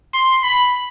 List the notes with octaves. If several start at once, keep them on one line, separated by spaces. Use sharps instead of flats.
C6
B5